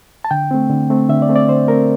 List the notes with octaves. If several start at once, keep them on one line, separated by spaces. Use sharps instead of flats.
A5
D3 G5
A3 C4
D3
A3 C4
D3 E5
D5
A3 C4
D5
D3 C5
A3 C4 A#4